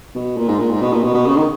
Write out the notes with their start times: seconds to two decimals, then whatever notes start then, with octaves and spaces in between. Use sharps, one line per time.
0.15 B2
0.37 A#2
0.48 G#2
0.59 A#2
0.71 G#2
0.82 B2
0.93 A#2
1.03 B2
1.14 B2
1.26 C#3
1.37 D#3